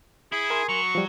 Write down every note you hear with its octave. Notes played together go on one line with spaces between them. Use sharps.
E4 G#4
A#4 G#5 C6
F#3 C#6
F3 G3